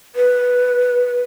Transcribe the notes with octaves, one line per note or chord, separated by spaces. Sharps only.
B4